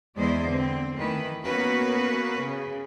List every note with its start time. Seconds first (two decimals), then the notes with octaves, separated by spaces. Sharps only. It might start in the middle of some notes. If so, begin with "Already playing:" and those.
0.16 E2 G#3 E4 C5 D5 D#5
0.46 D3 C4
0.96 D#3 E3 A3 B4
1.44 A#3 B3 C#4 F#4 A#4 B4
2.43 C#3